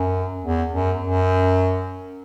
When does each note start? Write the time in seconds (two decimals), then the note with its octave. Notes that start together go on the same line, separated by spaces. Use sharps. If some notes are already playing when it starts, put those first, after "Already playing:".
Already playing: F#2
0.44 E2
0.73 F#2
1.02 F#2